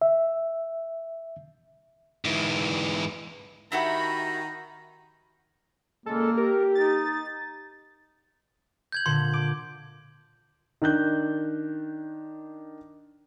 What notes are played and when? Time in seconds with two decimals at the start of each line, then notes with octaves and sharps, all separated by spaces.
0.02 E5
2.25 G#2 E3
3.72 D#3 E4 F#4 G4 E5 A#5 B5
6.06 A#2 C#3 G#3 A#3 A4
6.37 G4 A#4
6.75 D#4 A6
8.92 G6 G#6 F#7
9.06 A#2 D3 C6
9.33 D6
10.82 D#3 D4 F#6 G6